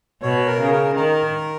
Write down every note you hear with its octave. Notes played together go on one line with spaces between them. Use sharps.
B2 C#5
A#4
C#3 G#4
A#4
D#3 A#4